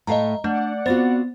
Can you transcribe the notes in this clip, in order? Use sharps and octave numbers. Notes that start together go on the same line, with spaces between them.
A2 A3 D#5 F5 A#5
A3 D4 D5 F#5
B3 C4 F4 F#4 C5 A6